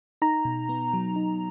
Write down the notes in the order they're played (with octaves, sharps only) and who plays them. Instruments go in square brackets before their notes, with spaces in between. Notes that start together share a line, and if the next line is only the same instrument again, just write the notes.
[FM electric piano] D#4 A#5
B2
B3
F#3
D#4